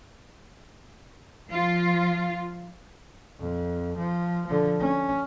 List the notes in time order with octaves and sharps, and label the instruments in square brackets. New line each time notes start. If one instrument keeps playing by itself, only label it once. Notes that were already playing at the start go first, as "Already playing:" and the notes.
[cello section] F3 F4
[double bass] F2
F3
D3 F3
C#4